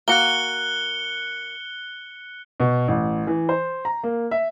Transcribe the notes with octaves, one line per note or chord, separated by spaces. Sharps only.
A#3 F#4 F#6 C#7 G7
B2
A1
E3
C5
A#5
A#3
E5